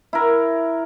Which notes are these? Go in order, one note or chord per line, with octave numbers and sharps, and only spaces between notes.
E4 A#4